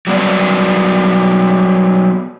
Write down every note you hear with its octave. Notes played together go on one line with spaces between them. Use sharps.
F#3 G3 B3 D5